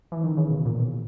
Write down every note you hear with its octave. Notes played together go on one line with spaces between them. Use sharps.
E3
D#3
C#3
B2
A#2
B2